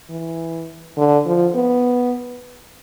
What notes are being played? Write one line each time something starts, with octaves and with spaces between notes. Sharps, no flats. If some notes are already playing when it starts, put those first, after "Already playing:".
E3
D3
F3
B3